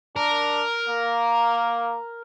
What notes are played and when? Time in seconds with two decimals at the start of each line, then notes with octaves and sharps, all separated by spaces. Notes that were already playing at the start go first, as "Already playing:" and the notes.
0.16 D4 A#4
0.89 A#3